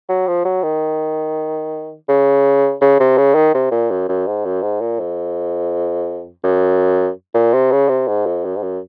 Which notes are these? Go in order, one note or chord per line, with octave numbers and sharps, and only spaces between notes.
F#3
F3
F#3
D#3
C#3
C#3
C3
C#3
D#3
C3
A#2
F#2
F#2
G#2
F#2
G#2
A#2
F2
F#2
A#2
C3
C#3
C3
G#2
F2
F#2
G#2
F#2